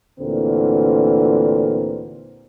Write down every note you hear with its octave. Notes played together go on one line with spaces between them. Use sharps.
D2 A#2 D3 E3 C4 A#4